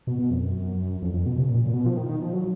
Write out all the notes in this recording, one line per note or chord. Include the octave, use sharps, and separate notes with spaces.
B2
B2
F2
F#2
F2
F2
B2
C#3
A#2
A#2
B2
F3
D#3
D#3
F3
F#3